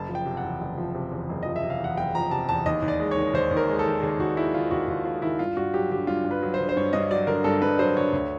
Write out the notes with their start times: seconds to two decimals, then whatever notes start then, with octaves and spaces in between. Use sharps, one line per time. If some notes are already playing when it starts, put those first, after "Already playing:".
Already playing: F#1 A5
0.09 F3
0.15 G5
0.25 C3
0.37 F#5
0.43 E2
0.61 F#1
0.78 F3
0.95 C3
1.11 E2
1.29 F#1
1.43 F3 D#5
1.56 E5
1.64 C3
1.70 F5
1.80 E2 F#5
1.97 F#1 G5
2.15 F3 A#5
2.31 C3 A5
2.49 E2 A5
2.66 D#2 D#5
2.82 D#2
2.88 D5
2.99 G#3
3.11 C#5
3.17 D#3
3.34 D#2 C5
3.51 D#2
3.57 A#4
3.69 G#3
3.79 A4
3.86 D#3
4.03 D#2 G#4
4.19 D#2 F#4
4.37 G#3 E4
4.54 D#3 F4
4.71 D#2 F#4
4.88 D#2 F4
5.05 G#3 F4
5.22 D#3 E4
5.39 G2 F4
5.57 G2 F#4
5.74 F#3 G4
5.91 D3 G4
6.07 G2 F4
6.24 G2
6.31 B4
6.42 F#3
6.54 C5
6.60 D3
6.69 C5
6.77 G2 C#5
6.93 G2 D#5
7.11 F#3 D5
7.27 D3 A#4
7.44 G2 A4
7.62 G2 B4
7.79 F#3 C5
7.97 D3 C#5
8.13 D2